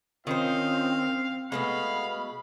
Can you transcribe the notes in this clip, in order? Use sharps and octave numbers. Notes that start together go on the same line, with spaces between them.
D#3 C4 C#4 D#4 F4 C5 F5
B2 F3 G#3 A3 B3 F5 B5